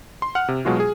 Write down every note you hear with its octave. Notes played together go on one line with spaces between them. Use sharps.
C6
F#5 F6
C3
B2 F#3 G#3 F4 F#4
G#4